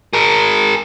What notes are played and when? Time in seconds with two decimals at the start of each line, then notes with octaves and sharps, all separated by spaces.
0.13 G#4 A#4